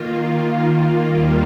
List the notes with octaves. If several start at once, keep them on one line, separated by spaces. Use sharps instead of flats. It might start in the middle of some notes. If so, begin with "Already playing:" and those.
Already playing: D#3 A#3 F4
D#2 D#3 G3 A#3 F4